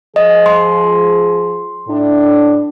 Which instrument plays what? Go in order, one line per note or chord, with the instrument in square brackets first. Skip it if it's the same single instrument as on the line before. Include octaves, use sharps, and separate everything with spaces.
[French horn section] F3 G#4 [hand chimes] D#5
[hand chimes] C6
[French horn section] A2 D4